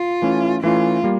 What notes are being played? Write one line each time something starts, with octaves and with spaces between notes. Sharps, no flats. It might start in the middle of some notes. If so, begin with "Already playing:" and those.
Already playing: F4
E3 A3 C#4
E3 A3 C#4 F4
G3 A#3